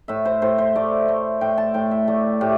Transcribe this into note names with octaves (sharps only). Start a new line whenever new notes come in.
A2 E5
C5
A2 C5
C5
A3 D5
A3
A2 G5
A5
A2 G5
E5
A3 D5
A2 G4